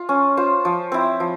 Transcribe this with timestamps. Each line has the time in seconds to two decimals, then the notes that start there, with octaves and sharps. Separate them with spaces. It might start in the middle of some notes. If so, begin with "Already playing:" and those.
Already playing: F4
0.09 C#4
0.37 F4 C5
0.65 F3
0.92 C4 E4
1.20 F3